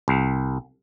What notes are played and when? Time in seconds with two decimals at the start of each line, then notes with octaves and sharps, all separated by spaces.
0.08 C2